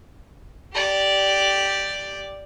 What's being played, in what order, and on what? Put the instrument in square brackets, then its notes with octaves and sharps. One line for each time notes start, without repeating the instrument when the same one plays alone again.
[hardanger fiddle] G4 D5